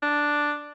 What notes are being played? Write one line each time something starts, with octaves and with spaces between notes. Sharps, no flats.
D4